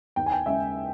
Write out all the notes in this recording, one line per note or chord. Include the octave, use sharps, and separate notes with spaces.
D#2 G5
G#5
G5
C#3 G#3 E5